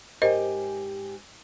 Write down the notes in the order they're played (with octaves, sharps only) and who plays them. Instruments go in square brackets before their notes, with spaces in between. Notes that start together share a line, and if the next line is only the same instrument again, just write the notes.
[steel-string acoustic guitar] G#2 G4 G#5 [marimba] A#4 C5 D#5